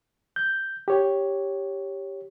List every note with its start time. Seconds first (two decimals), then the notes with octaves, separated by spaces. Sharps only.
0.36 G6
0.88 G4 C#5